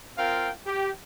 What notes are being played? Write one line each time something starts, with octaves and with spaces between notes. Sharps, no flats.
C4 F4 A#4 F5 G5
G4